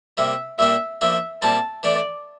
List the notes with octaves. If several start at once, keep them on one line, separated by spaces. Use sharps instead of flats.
C3 G3 A#3 E5
A#2 G3 A#3 D4 E5
F3 A#3 D4 E5
A#2 G3 C4 E4 A5
E3 A3 D4 D5